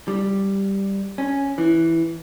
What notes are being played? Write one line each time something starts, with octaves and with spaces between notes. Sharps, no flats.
G3
C#4
E3